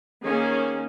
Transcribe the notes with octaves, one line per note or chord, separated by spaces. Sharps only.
D#3 A#3 C#4 G#4